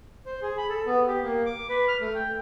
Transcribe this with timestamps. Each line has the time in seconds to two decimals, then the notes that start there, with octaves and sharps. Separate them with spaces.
0.26 C5
0.42 G#4
0.58 B5
0.70 A4
0.86 B3
1.07 G4
1.23 A#3
1.46 D6
1.69 B4
1.88 F6
2.01 A3
2.15 G5